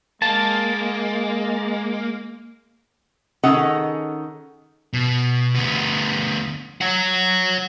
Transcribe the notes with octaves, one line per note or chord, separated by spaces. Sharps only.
G#3 A#3 A5
D#3 C#4 G#4 A4 D#5 F#5
B2
D2 B3
C#5 F#5